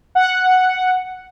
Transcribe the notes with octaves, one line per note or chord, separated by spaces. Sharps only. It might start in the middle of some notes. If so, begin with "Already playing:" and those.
F#5